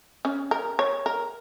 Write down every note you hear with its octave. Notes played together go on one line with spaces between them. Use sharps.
C#4
A#4
C#5
A#4